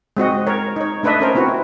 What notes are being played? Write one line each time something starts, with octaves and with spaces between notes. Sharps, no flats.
G#3 C4 F#4 D#5
A#4 C#5
D#4 C#5
A3 D4 B4 D#5 E5
C#4 A#4 C5
B3 C4 E4 F#4